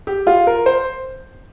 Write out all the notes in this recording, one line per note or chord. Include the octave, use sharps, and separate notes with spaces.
G4
F4
A#4
C5